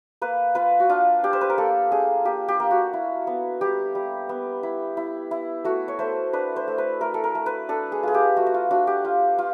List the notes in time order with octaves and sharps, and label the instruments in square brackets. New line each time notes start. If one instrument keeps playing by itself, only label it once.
[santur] A#3 B4
F4 B4
F#4
D4 F4
D4 G4
C5
B4
A#4
A#3 A4
D4 G#4
A#3 G4
G4
A#3
F#4
E4
B3
G3 G4
G3
B3
E4
E4
E4
A3 F#4
C#5
A3 C5
D4 B4
C5
A3
B4
A3 A#4
A4
A#4
A3
B4
D4 A4
G#4
F4 G#4
G4
A3 F#4
F#4
F4
D4 F#4
G4
F4
F4